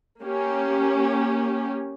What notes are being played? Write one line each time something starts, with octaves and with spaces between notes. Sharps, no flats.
A#3 C#4 G4